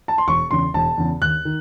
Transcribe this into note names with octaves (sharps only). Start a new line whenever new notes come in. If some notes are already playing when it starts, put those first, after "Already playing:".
A5
C6
E1 C#6
E2 C#3 C6
E1 A5
E2 C#3
D#2 F#6
D#3